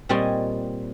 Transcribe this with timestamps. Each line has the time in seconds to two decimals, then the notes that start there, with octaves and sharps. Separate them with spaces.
0.09 A#2 G3 C4 C#5 D#5 G#5